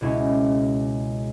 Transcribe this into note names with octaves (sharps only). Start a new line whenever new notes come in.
C#2 B2 G#3 C#4 E4